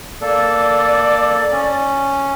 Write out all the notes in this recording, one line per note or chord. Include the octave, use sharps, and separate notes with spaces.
A#3 A4 D5
C#4